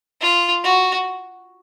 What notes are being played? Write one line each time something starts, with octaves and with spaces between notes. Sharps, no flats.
F4
F#4